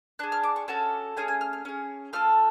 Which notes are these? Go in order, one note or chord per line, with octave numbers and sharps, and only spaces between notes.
D4 G#4 F#6
F6
D6
C#6
C#4 F#4 A4 A5
A3 C#4 G#4 G#5
G#5
F6
F6
C#4 G#4
A3 F4 A4 F6